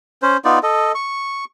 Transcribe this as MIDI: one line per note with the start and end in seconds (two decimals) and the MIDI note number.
0.22 0.37 61
0.22 0.37 72
0.45 0.59 59
0.45 0.59 63
0.45 0.59 65
0.45 0.59 74
0.63 0.92 69
0.63 0.92 75
0.95 1.45 85